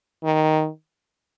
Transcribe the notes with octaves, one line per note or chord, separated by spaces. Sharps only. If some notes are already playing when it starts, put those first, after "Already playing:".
D#3